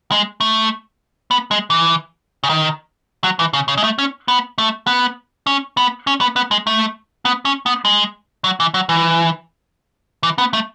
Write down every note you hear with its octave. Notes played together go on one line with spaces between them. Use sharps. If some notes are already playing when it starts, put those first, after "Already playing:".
G#3
A3
B3
G#3
E3
C#3
D#3
F#3
E3
C#3
C#3
G#3
A3
C#4
B3
A3
B3
C#4
B3
C#4
B3
B3
G#3
A3
B3
C#4
B3
G#3
F#3
E3
F#3
E3
E3
B3
A3